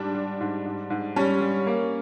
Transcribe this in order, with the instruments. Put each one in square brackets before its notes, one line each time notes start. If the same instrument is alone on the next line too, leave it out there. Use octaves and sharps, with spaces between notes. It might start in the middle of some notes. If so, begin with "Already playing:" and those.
Already playing: [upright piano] G#2 G3 [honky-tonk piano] D4
[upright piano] G3
G#2
G#2
G#2
[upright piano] G3 [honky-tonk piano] C#4
[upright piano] G3
A#3